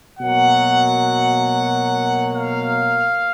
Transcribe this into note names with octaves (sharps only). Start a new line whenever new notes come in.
B2 F#3 A#3 F#5
F5